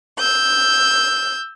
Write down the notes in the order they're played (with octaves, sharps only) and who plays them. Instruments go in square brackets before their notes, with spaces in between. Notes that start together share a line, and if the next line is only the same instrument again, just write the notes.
[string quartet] E6 G6